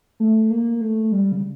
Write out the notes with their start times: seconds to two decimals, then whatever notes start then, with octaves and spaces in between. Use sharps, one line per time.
0.20 A3
0.50 A#3
0.81 A3
1.12 G3
1.32 C#3